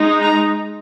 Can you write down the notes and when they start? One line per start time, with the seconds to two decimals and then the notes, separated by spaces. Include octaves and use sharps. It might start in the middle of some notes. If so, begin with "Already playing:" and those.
Already playing: G#3 D#4
0.22 A#5